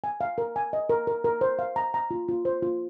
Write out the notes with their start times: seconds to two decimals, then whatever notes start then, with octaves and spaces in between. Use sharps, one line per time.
0.04 G#5
0.21 F5
0.38 A#4
0.56 G#5
0.73 D#5
0.89 A#4
1.07 A#4
1.24 A#4
1.41 C5
1.59 F5
1.76 A#5
1.94 A#5
2.11 F4
2.28 F4
2.45 C5
2.62 F4